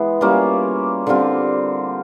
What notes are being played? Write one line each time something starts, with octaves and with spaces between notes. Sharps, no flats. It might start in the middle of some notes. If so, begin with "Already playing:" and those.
Already playing: E3 G#3 B3
G3 A#3 C#4 F4
D3 G3 C4 F4